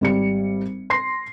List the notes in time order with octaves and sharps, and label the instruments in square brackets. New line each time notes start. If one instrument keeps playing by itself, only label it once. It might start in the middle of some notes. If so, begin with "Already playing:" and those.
[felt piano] G#1 G3 C#7
C6 A#6 C7